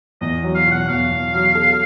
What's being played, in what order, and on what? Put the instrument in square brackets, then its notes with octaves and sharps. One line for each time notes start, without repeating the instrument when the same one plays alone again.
[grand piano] E2 [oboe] D#5
[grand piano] F#3
[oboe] F5
[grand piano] B2
[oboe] F#5
[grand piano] E2 [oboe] F5
[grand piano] E2
F#3
A4